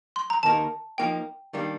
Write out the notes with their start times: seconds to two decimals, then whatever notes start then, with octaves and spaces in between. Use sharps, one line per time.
0.16 C6
0.30 A#5
0.43 D#2 D#3 A#3 D#4 A#4 A5
0.98 F3 A#3 D#4 G5
1.53 D#3 G3 A#3 D4